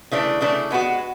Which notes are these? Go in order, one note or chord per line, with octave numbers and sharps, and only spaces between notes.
C#3 E3 A3 D4
C#3 E3 A3 D4
G#3 B3 F#4